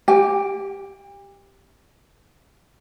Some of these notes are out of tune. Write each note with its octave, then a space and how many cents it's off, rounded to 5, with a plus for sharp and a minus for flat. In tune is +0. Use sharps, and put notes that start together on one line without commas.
G4 +0 G5 +45